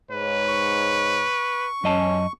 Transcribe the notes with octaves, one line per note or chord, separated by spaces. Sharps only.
G#2 B4 C#5
C#6
F#2 C#4 D#5 A5